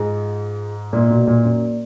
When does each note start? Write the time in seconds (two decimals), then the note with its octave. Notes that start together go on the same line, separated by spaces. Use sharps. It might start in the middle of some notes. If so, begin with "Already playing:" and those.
Already playing: G#2 F4 G#4 D#5
0.93 A#2 A#3 D#4 A#4 D5
1.10 B2
1.27 A#2
1.45 F#2